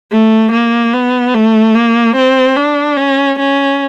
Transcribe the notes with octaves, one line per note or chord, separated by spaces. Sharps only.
A3
A#3
B3
A3
A#3
C4
D4
C#4
C#4